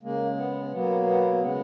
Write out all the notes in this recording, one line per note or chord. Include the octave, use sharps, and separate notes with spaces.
C#3 G#3 A#3
B3
B2 F#3 A#3 B3
B3
C#3 G#3 B3